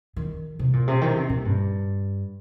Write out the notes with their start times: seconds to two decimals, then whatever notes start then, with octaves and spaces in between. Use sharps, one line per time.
0.16 D#3
0.59 C3
0.73 A#2
0.88 C3
1.01 D#3
1.16 C3
1.30 A#2
1.45 G2